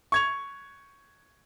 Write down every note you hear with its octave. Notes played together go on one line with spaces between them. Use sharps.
C#6 G#6 F7